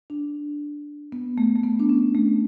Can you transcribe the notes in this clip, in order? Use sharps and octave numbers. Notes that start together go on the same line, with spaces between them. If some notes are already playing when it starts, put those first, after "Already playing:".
D4
B3
A3
A3
B3
D4
C#4
A3